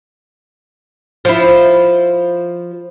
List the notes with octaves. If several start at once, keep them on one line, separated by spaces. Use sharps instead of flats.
F3 E4